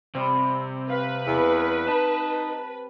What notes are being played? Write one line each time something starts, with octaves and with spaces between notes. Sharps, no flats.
C3 G3 C4
B4 F5
E2
D#4 A5